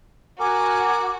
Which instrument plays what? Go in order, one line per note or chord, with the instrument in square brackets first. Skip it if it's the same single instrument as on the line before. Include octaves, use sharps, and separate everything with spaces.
[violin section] F#4 [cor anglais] A#4 [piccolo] G#5 [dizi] D6